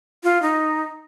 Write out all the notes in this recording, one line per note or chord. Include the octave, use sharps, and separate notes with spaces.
F4
D#4